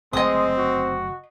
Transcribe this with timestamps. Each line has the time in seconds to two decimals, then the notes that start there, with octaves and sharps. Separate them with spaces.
0.13 F#1 D3 G#3 A3 C4 D#5 D#6
0.58 F#4